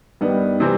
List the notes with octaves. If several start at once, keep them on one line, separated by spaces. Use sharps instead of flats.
G2 D#3 G3 B3
C3 E3 G3 C4